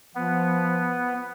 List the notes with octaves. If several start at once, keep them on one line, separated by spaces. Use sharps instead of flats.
F3 B3